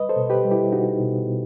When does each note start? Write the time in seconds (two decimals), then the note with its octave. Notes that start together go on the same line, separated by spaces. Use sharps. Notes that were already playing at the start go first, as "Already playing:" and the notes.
Already playing: G3 B4 D#5
0.09 A4 C5
0.16 B2
0.30 G4 B4
0.44 G3
0.51 E4 G4
0.72 B2 D#4 F#4
1.00 B2
1.27 B2